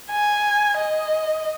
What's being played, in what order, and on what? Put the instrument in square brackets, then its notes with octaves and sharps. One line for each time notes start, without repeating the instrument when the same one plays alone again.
[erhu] G#5
D#5